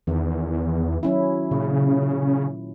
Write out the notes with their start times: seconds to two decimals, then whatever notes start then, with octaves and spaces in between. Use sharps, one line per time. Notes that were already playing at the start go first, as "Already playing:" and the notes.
0.07 E2 D#3
1.03 F#3 C#4 E4
1.51 A#2 C#3